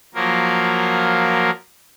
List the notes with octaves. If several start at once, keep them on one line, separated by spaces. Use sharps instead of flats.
F3 F#3 A#3 A#4